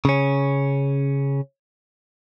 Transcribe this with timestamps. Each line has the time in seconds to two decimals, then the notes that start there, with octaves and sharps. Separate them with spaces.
0.05 C#3 C#4